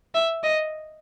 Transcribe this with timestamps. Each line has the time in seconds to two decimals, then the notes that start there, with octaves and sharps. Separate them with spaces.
0.15 E5
0.44 D#5